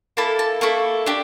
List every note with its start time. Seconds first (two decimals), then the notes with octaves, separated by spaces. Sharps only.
0.17 A#3 E4 A4 A5
0.39 A5
0.61 A#3 E4 A4 C#6
1.06 D4 G4